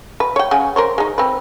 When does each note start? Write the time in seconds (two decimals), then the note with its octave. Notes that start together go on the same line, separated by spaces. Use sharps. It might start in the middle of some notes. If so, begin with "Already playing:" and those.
0.20 B4
0.36 C#5 G5
0.51 C#3 F#5 G#5
0.76 A#4 C5 C#5
0.98 G#3 D#4
1.18 C4 B4